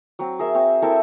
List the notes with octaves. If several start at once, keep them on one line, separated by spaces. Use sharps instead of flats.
F#3 C4
G#4 A#4 E5
C4 F#4
C4 E4 A4 A#4